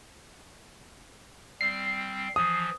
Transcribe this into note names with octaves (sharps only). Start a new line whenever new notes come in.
G3 C4 C7
E3 F3 D#6